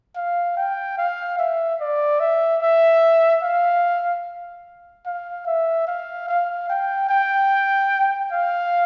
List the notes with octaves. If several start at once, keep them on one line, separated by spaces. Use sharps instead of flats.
F5
G5
F5
E5
D5
E5
E5
F5
F5
E5
F5
F5
G5
G5
F5